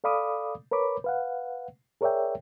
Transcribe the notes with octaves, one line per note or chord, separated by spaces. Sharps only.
A4 D5 F5 B5 D6 D#6
A#4 B4 C#5 B5 D6
B4 F5 F#5
G#4 A#4 C#5 D5 E5 G5